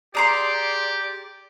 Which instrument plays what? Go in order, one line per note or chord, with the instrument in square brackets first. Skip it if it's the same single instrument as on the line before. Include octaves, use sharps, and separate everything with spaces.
[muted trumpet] G4 [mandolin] G#4 A#5 C6 [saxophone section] D5